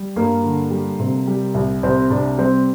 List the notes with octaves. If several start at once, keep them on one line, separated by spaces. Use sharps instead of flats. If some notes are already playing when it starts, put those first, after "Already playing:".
Already playing: G3
G2 A#3
D3
G3
C3
G3
C2
C2 C4
C3 D4
G3 C4